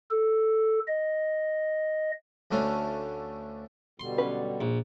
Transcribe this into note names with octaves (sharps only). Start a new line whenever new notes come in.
A4
D#5
D2 D3 A3 C#4 F5
B2 D3 G3 C6
F#3 C#4 B4
A#1